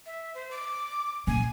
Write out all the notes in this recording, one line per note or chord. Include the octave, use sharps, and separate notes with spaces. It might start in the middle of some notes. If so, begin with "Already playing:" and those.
E5
C5
D6
A#2 G#5